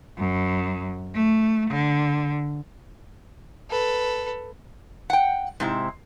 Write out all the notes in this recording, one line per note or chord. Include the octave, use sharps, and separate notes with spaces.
F#2
A3
D3
A4 B4
F#5 G5
G#2 C3 E4